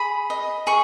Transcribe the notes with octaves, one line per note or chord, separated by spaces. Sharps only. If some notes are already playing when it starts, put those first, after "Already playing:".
Already playing: G#4 B5
D#5
G#4 C#6